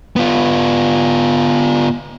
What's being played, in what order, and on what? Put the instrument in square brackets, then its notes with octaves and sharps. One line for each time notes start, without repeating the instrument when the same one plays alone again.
[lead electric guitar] B3 F4